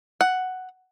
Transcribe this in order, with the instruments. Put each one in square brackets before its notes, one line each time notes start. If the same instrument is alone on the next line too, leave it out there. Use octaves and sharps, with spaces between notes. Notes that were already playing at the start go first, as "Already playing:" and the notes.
[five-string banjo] F#5